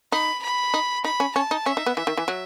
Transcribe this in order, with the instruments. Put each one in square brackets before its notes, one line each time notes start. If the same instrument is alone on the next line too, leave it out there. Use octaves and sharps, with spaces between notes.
[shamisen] D#4 [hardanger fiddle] B5
[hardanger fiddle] B5
[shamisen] D#4
[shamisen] D#4 [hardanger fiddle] B5
[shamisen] C#4
[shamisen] C#4 [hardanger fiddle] A5
[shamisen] D#4
[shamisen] C#4 [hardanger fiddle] E5
[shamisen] D#4
B3
[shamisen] E3 [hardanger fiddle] E5
[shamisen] D#3
E3
F#3